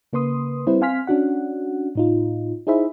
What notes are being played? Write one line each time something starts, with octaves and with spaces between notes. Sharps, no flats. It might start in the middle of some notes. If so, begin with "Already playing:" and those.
C#3 A#3 B4 C6 D#6
G3 C4 E4 B4 C5
C4 F5 G#5 C6 F6 B6
C#4 D4 F#4 F#5
A2 D#4 F4
D#4 E4 G#4 C5 E5 B5